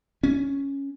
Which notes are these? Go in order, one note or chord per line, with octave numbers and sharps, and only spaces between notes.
C#4